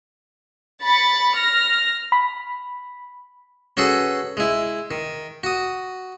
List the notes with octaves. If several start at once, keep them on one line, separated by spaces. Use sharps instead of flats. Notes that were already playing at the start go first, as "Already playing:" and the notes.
B5 A6 C#7
F6 A#6
B5
C#4 F#4 G#4 A4 B4
G#3 E4
D#3
F#4 D#6